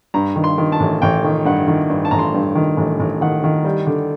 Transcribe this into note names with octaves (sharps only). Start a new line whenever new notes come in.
G2 A#5
D#3
C6
D#3
A5
A1
A1 G5
D#3
G2 F#5
D#3
G2
A5
A1 A#5
C6
G2
D#3
A1
A1
D#3 F#5
D#3
G3
D3